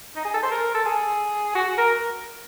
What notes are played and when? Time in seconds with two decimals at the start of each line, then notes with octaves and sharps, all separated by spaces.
0.16 D#4
0.25 G#4
0.34 A4
0.43 C5
0.51 A#4
0.74 A4
0.85 G#4
1.55 F#4
1.77 A#4